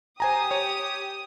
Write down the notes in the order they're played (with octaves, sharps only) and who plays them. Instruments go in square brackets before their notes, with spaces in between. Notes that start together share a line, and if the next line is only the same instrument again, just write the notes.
[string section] G4 D#6 [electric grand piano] C5 G#5 A#5
[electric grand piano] C#5